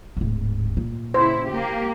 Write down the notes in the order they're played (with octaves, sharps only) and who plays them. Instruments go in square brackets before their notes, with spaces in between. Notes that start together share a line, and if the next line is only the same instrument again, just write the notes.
[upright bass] D1 G#2
A#2
[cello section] C#3 E4 [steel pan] C5
[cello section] A#3 G4